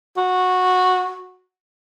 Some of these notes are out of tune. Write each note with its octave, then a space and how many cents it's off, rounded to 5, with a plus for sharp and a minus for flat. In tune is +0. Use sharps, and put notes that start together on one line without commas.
F#4 -10